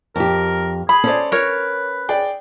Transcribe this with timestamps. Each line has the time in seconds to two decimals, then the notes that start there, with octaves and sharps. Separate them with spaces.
0.16 F2 G4 A#4
0.89 G#4 B5
1.04 C#4 A4 C5 D5
1.32 A#4 B4 C#5 C#6
2.09 G#4 D5 G5